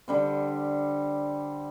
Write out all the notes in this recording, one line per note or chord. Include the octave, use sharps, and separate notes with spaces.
D3 G3 C4